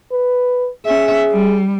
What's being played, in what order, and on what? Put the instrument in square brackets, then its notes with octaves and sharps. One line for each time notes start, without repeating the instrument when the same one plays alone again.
[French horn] B4
[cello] C#4 E5 [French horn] G#4
[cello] G3